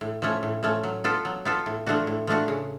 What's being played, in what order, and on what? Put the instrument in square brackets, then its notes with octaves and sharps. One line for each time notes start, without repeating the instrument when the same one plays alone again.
[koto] A2
F3 A3 C#4
A2
F3 A3 C#4
F#3
B3 F4 A4
F#3
B3 F4 A4
A2
F3 A3 D4 F#4
A2
F3 A3 D4 F#4
C#3